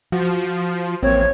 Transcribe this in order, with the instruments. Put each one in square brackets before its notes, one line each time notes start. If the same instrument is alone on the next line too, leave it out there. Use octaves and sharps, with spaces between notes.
[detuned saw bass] F3 [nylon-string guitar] F#4
[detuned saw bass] A1 [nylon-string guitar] A#3 C4 [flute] C#5